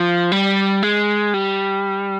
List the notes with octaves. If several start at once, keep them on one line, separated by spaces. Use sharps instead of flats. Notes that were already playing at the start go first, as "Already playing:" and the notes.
Already playing: F3
G3
G#3
G3